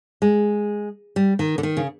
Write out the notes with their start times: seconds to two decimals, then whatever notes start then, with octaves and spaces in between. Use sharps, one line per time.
0.22 G#3
1.16 G3
1.39 D#3
1.58 D3
1.63 D#3
1.77 C#3